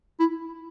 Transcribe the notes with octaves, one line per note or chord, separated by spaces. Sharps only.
E4